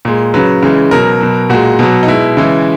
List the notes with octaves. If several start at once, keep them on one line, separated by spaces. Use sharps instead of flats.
A#2 G#3
C#3 F#3 B4
C#3 E3 G#3
B2 F#3 A#4
B2 F#3
A#2 G#3 F#4
B2 F#3
D#4
B2 G#3 E4
C#3 E3 G#3